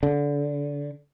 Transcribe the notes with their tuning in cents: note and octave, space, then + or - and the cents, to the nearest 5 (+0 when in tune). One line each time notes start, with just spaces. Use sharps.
D3 -25